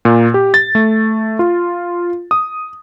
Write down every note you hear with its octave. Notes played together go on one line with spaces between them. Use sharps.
A#2
G4
A6
A3
F4
D#6